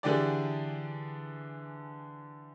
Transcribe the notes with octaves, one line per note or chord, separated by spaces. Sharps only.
D3 E3 D4 G4 G#4 D5